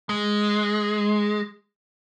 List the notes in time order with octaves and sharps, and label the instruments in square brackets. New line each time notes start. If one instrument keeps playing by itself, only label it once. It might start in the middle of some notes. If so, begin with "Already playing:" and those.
[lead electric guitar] G#3